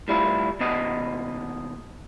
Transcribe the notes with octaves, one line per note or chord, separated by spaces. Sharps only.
A2 G3 E4 F4
D#2 B2 D#5